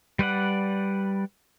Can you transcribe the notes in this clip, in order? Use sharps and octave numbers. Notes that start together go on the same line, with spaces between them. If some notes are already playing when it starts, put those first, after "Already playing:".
G3 B4 D5 F#5